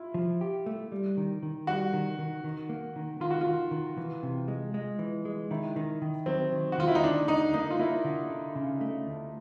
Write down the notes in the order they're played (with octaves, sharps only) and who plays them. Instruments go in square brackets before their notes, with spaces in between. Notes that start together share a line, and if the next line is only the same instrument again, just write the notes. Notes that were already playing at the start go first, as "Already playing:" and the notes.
Already playing: [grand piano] E4 F4
[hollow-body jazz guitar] F3
G4
A3
G3
D#3
D#3
[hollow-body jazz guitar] G3 [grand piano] F#4
[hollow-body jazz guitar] D#3
D#3
D#3
A#3
D#3
[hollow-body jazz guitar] D#3 [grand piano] F4
[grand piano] F#4
F4
[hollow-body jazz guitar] D#3
D#3
E3
C3
G#3
G#3
E3
G#3
[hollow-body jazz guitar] D#3 [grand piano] E4
[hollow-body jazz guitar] D#3
D#3
[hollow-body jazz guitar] F#3 [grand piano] C4
[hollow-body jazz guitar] D#3
[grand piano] F#4
[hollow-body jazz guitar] D#3 [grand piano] F4
[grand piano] E4
D#4
[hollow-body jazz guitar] D2 [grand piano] D4
[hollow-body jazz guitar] D3 [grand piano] D#4
[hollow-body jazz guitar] A#3 [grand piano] D#4
[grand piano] F4
[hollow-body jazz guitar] A#3 [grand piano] E4
[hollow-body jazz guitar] D3
D3
C#3
A3
D2